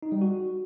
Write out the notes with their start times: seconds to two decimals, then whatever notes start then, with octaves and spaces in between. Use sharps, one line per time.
0.03 D#4
0.12 G3
0.21 F#4